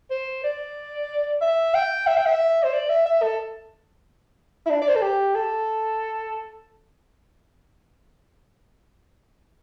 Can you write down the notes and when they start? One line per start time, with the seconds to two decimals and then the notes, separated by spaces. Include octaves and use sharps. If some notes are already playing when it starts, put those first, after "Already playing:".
0.10 C5
0.44 D5
1.42 E5
1.74 G5
2.07 E5
2.17 G5
2.26 E5
2.63 C5
2.73 D5
2.89 E5
3.06 E5
3.22 A4
4.66 E4
4.70 D4
4.82 D5
4.89 C5
4.95 A4
5.02 G4
5.35 A4